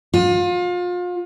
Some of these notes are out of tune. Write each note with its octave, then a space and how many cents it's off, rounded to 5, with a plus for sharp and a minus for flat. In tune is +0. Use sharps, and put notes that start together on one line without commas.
F4 +35